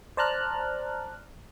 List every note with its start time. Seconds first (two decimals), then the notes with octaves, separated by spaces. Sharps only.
0.17 C5 D5 A5 A#5 F6 F#6